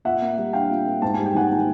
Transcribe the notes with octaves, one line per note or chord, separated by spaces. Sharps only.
A#2 E5 F#5
A#3
G3
D4 F5 G5
A#2
A#3
G#2 A5
G3 G#5
G5
D#3 F#5 G#5
A#3